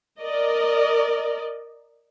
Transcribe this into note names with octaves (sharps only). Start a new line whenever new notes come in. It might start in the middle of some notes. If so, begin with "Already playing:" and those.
A#4 D5 D#5